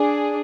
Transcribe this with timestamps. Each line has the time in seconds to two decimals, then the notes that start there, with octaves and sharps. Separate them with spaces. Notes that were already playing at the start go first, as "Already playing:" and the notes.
Already playing: D4 G#4